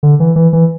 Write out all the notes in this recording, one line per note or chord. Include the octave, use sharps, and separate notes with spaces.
D3
E3
E3
E3